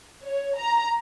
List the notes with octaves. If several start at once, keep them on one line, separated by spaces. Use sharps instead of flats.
C#5
A#5